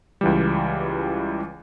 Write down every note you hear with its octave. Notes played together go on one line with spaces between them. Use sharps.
C#2 E3 G3